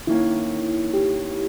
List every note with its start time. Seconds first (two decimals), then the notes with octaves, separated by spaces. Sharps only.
0.07 D#3 A#3 C#4 E4
0.94 G4